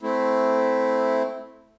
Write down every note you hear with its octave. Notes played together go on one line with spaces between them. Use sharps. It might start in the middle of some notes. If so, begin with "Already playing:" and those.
A3 C4 E4